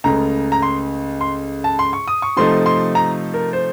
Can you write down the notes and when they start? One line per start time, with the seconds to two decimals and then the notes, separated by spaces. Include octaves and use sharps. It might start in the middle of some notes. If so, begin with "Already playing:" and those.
0.04 C#2 C#3 A3 A#5
0.52 A#5
0.62 C6
1.21 C6
1.64 A5
1.79 C6
1.93 C#6
2.07 D#6
2.22 C#6
2.37 C3 F3 A3 D#4 C6
2.66 C6
2.95 A#5
3.34 A#4
3.53 C5